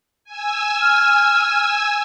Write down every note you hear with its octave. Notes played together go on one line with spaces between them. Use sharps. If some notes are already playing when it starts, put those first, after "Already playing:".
G#5 E6
F6